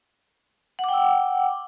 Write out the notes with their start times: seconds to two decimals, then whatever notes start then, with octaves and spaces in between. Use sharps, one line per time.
0.79 F#5
0.84 D6
0.89 G5
0.93 E6